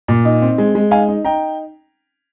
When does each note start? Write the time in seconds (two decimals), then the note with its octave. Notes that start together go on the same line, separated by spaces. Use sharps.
0.08 A#2
0.25 D#4
0.42 C4
0.58 G#3
0.75 G#3
0.91 D#4 F5 G#5
1.08 D#4
1.25 D#4 G5 A#5